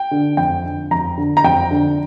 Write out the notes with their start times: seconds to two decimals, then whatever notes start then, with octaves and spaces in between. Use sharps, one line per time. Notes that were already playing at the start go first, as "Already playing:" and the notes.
Already playing: G5
0.11 D3
0.37 F2 G5
0.63 D3
0.91 F2 A#5
1.17 D3
1.37 A#5
1.44 F2 G5
1.71 D3